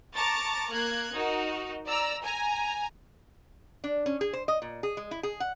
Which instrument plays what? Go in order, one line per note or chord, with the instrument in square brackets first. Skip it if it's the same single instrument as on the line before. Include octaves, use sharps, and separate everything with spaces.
[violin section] A5 A#5 C#6 D6 A6
A#3 F#6 G#6
D#4 F#4 A#4
D5 A#5 E6
G#5 A#5
[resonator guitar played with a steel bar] D4
C#4
G#4
C5
D#5
A#2
G#4
G#3
E4
G#4
F#5